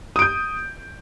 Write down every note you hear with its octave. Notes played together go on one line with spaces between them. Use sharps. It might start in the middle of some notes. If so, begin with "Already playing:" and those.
D#6 G6 D7